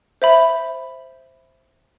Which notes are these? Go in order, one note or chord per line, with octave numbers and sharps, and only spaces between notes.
C5 E5 B5